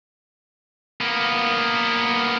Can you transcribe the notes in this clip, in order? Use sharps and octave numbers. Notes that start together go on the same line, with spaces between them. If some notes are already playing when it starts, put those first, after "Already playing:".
A#3 B3